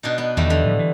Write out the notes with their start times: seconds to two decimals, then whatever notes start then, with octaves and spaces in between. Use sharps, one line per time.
0.03 B2 D4 D#4
0.18 B3
0.37 E2 D#3 G3 A3
0.50 D3
0.64 A2 F3
0.79 E3